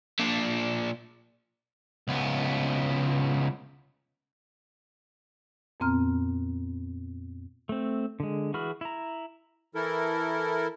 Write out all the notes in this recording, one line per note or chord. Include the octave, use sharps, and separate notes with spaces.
A#2 D4
C#2 B3
F2 A#2 B3 C4 A#5 F6
A3 C4
D3 G#3
E3 F#4 G#4 B5 F6
E4 A#5
E3 E4 A4 A#4